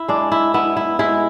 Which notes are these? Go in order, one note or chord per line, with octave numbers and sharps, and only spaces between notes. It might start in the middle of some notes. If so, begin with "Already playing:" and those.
Already playing: E4
G#3 D4
E4
B3 E4
E4
G#3 E4